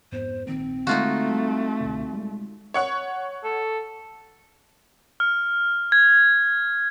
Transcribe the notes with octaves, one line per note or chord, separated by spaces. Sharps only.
F2 G#2 B3 C5
A#1 D#3 A#3 C4
D3 G#3 A3 D#4 F4 F#4
G3
C2 B2 D3
G3 G#3
C#5 F#5 C#6
A4
F6
G#6